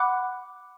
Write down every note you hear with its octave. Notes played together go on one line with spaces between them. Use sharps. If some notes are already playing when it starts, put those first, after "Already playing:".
Already playing: F#5 B5 D6 F#6